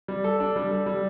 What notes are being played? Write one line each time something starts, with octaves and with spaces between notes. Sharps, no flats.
G3
A4
D4
G3
A4
G3